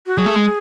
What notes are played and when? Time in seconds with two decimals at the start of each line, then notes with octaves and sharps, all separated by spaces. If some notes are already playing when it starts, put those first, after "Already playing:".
0.07 F#4
0.17 F#3 G#4
0.26 A3
0.36 G#3